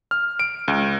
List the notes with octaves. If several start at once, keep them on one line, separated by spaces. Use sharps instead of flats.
F6
D7
C#2